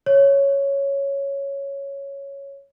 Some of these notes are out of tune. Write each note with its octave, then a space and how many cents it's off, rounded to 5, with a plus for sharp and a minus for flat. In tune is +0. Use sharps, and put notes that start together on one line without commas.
C#5 +0